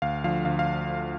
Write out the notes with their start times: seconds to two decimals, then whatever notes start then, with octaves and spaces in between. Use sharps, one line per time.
0.02 D2 F5
0.24 D3 F3 F5
0.45 D2 F5
0.59 F5